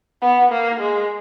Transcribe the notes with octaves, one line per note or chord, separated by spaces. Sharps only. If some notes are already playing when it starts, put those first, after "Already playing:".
B3
A#3
G#3